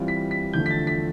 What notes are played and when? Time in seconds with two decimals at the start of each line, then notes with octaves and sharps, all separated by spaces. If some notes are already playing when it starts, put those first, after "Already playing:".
Already playing: E3 G3 C4 F4
0.08 B6
0.31 B6
0.53 E2 D3 F3 A3 G6
0.66 B6
0.71 A6
0.87 B6